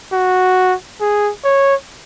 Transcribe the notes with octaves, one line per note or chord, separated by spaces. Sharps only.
F#4
G#4
C#5